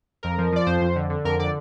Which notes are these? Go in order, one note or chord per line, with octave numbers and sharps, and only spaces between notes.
F2 A#4
F3
F3 D5
F2 C5
F2
D3
D3
F2 A#4
D3 D5